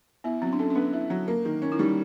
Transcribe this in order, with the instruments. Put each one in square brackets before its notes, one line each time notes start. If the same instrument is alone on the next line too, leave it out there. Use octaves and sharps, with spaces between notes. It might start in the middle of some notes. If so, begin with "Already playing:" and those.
[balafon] B3 [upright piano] E4
[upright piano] F#3 [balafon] C4
[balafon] D4
[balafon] C#4 [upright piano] A4
[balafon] C#4
[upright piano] B3 [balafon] D4
[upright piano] E4
F#3
A#3
D#3
C#4
[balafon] E4
[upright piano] G3 [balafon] D#4